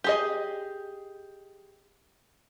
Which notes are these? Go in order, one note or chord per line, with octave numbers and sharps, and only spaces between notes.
G4 G#4 D#5